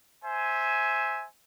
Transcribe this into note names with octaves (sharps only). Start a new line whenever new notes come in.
C5 E5 G#5